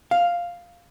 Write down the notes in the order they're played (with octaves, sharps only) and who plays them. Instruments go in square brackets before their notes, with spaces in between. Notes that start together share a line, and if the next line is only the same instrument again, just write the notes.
[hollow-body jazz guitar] F5